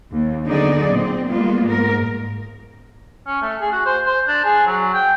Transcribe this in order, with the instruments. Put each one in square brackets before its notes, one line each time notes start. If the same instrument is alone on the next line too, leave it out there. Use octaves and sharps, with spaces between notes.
[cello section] D#2
D3 F#3 B3 D#4 G#4 D5
A#2 C4
G3 G#3 A#3 B3 F4
G#2 A#4
[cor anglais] C#4
A3
G#4
F#4
C5
C5
D4
G#4
F#3
G5